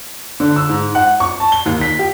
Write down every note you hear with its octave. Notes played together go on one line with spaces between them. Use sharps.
D3
E6
G#2
F#5
C#6
A5
G7
D#2
B6
G4